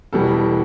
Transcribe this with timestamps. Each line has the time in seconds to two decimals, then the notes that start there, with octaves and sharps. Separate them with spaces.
0.13 E1 E2 B2 G3 A4